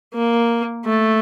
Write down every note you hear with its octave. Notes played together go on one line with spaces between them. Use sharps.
A#3
A3